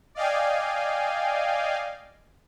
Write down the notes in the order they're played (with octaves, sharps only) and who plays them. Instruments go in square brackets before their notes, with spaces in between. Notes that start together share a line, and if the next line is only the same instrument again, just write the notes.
[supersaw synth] D5 D#5 F5 G5 G#5